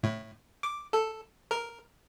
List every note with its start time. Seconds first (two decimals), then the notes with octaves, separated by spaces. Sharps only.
0.03 A2
0.63 D6
0.93 A4
1.51 A#4